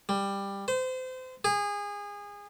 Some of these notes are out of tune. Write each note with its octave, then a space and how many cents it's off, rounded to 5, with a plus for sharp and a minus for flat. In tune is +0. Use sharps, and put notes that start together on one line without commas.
G3 +15
C5 -30
G#4 -25